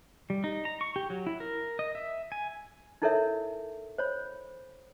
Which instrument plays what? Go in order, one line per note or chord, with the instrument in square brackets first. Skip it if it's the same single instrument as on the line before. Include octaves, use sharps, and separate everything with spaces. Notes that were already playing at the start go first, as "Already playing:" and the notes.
[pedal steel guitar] G3
D#4
A#5
C#6
G4
F#3
E4
A#4
D#5
E5
G#5
[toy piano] D#4 E4 A4 A#4 C#5 E5
C5 C#5 B5